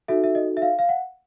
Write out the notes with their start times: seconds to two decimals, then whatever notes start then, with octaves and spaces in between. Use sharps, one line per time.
0.08 D#4 F#4 A4 E5
0.24 E5
0.35 D#5
0.57 E5
0.62 F5
0.79 F5
0.89 F#5